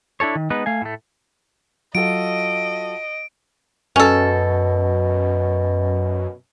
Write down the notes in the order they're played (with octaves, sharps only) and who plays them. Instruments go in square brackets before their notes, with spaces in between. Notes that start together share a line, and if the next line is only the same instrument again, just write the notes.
[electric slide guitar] D4 E4 A4 C#5
D#3
G#3 B3 D#4 B4
A3 F5 G#5
A2 A3
[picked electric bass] F#3 [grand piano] F4 F#4 A4 [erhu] D#5 [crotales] D7
[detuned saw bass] F#2 [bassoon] B2 [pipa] C#4 A4